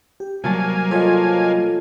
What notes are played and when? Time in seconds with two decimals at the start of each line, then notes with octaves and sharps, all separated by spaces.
0.20 G4
0.44 C2 F#3 G3 A#3 G#5 A5
0.91 F3 A4 C#5 D#5